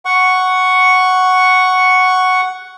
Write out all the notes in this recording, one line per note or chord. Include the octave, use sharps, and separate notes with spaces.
F#5 C#6